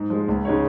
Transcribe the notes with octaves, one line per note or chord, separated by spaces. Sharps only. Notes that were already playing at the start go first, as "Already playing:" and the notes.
Already playing: G#2
F3 G#3
C#2
C#3 G#3 D#4 C#5